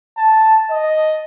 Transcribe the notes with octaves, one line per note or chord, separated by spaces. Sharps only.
A5
D#5